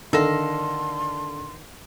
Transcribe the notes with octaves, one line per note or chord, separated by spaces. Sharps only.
D3 D#3 A4 F5 C6 A#6